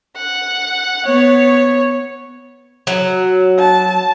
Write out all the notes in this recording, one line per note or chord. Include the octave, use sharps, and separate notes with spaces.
F#5
B3 C#5
F#3
A5